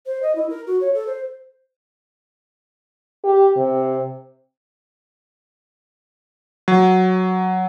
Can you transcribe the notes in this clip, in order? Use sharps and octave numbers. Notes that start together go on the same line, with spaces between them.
C5
D#5
E4
A#4
F#4
C#5
A4
C5
G4
C3
F#3